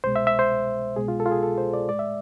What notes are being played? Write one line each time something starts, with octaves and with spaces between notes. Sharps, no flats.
C2 B2 G#3 C5
E5
E5
C5
C2 B2 G#3 G#4
F4
A4
F4
G#4
A4
C5
D5
A2 G#3 D5
E5